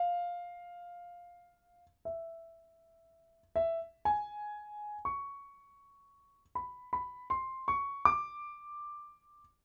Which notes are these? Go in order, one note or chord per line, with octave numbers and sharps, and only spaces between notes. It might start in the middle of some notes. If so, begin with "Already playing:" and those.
Already playing: F5
E5
E5
G#5
C#6
B5
B5
C6
C#6
D6